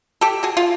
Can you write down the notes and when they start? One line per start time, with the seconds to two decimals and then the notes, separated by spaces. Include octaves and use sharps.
0.21 G4 A4
0.43 F#4 G#4
0.57 F4